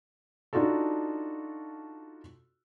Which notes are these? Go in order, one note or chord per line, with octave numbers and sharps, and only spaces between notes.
D4 D#4 F4 F#4 A4